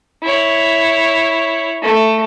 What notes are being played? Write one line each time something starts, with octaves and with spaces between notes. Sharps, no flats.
E4 C#5
A3